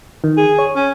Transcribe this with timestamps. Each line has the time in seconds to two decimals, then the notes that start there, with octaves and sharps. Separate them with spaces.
0.24 D#3
0.37 G#4
0.59 C#5
0.76 C#4